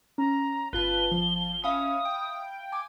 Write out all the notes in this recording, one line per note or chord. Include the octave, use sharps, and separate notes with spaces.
C#4 A#5
G1 F4 B4 A5 G7
F3
C#4 E5 F5 B5 D#6
G5
G#5 D6